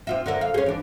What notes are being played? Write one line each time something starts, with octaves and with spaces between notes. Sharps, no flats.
C3 F4 E5
D3 A#4 E5
F5
C#4 G#4
E3 D4